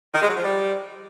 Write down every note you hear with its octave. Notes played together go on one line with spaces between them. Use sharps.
D#3
G#3
F#3
F3
G3